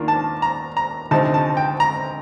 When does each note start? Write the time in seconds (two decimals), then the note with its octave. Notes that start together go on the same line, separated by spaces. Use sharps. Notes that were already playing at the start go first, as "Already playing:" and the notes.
Already playing: D#2 D#3 A#3 D4 F4
0.08 A5
0.42 A#5
0.77 A#5
1.11 D2 C3 F3 C4 D#4 A5
1.34 A5
1.57 G5
1.80 A#5